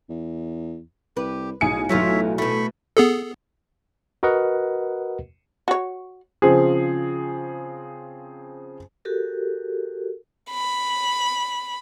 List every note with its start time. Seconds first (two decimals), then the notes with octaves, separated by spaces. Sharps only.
0.09 E2
1.17 C2 G4 B4
1.61 B1 A2 G#4 G#5 C#7
1.89 B1 E3 F#3 A3 F4 C#5 E5
2.38 B2 A3 B5 C#6
2.97 B3 G#4 A4
4.23 F#4 A#4 B4 D#5 F#5
5.68 F#4 C#5
6.42 C#3 F3 C4 G#4
9.05 F#4 G4 A4 A#4
10.51 B5